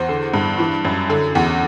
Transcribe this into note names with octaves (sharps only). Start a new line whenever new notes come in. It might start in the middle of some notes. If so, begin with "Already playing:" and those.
Already playing: E2 C5
D3
G2
E3
F#2
D3
E2